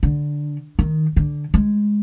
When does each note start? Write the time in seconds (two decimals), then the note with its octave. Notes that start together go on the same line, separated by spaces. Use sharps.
0.03 D3
0.79 D#3
1.16 D3
1.54 G#3